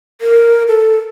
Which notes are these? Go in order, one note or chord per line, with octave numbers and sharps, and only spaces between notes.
A#4
A4